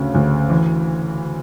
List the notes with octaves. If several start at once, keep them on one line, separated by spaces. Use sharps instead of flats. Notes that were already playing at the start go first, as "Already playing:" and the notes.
Already playing: D2 C#3
D2
E3